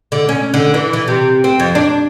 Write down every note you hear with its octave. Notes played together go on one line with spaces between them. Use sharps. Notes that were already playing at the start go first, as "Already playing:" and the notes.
D3
C#4
D3
E3
E3
C3
C4
F2
D4